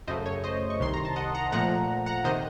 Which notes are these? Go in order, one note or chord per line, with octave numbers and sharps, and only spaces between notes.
F#2 C#3 A3 C5 D#5
C#5
C5 D#5
C#6
C2 C3 D#3 C6
A#5
A5
D#5 F#5
F#5 A#5
A#2 F3 A3 F#5 A#5
F#5 A#5
C3 D#3 C5 D#5